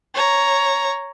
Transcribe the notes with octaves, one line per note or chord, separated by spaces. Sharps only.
C#5 A#5